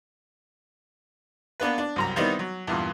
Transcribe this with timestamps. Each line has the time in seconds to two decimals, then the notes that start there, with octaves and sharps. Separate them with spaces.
1.60 A#3 B3 D4 B4
1.78 D4
1.96 C2 F#2 A#5
2.16 D#3 G3 B3 C4 D#4 E4
2.39 F#3
2.67 E2 G2 A#2